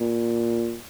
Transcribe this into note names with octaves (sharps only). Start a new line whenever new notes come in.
A#2